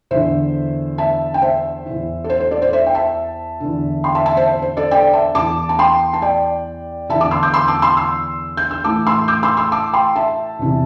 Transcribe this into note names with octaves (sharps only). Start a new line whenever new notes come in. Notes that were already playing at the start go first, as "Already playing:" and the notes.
E2 D3 C5 E5
E5 A5
G5
C5 E5
E2 E3
A4
C5
C5
A4 D5
C5
C5 E5
G5
E5 A5
E2 D3
G5 C6
E5 A5
E5 A5
C5 E5
C5
C5
A4 D5
D5 G5
E5 A5
E2 E3 A5 D6
A5
G5 C6
A5
D5 G5
E2 D3 E5 A5
A5 D6
C6 E6
D6 G6
C6 E6
A5 D6
C6 E6
C6 E6
G6
E6
A2 E3 A5 D6
C6 E6
D6 G6
C6 E6
C6 E6
A5 D6
G5 C6
E5 A5
E2 C3 E3